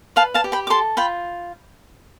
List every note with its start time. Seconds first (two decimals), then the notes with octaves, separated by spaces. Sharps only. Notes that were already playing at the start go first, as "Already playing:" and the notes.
0.16 B4 F5 A5
0.34 F5 A5
0.44 G4
0.52 G5 B5
0.67 D6
0.70 A4 A5 C6
0.97 F4 G5 B5